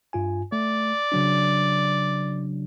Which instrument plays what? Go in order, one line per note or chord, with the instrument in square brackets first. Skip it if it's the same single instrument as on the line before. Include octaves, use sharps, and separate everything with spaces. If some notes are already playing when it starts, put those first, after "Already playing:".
[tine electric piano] G2 F4 G#5
[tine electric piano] A3 [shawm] D5
[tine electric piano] C#3 F#3 D4